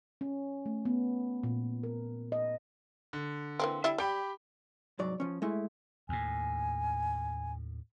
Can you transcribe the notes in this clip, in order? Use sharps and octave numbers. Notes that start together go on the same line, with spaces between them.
C#4
A3
B3
A#2
A#4
D#5
D3
E3 A#3 C4
G3 E4 E5
G3 G4 G5 B5
C2 G#2 F#3 D5
F3 C#4
G#3 A3 E4
D#2 A2 G#5